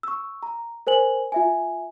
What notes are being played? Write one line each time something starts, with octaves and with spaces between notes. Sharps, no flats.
C#6 E6
A#5
A#4 C5 G#5 F#7
F4 E5 G#5